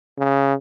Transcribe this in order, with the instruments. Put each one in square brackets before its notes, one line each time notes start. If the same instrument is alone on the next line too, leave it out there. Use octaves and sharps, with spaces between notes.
[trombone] C#3